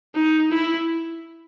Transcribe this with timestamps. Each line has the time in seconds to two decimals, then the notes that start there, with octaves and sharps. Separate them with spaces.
0.15 D#4
0.51 E4